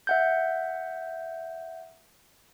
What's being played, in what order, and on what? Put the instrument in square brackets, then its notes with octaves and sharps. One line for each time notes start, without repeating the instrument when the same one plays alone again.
[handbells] E5 F#5 G6